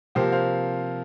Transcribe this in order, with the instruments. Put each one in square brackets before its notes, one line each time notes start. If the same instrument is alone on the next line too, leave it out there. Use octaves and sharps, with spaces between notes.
[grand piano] C3 F3 A#3 G4 C5
C5 F5